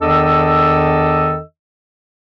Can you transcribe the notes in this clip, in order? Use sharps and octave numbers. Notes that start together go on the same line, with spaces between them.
E2 D#3 D4 A4 D#5 E6